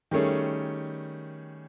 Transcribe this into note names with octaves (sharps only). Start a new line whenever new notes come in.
D#3 G3 A3 C#4 G#4